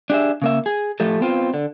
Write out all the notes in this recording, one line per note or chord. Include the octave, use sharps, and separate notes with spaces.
D4 G4 G#4 E5
C#3 A#3 E5
G#4
A2 F3 A3 G4 A4
B3 C4 F4
D3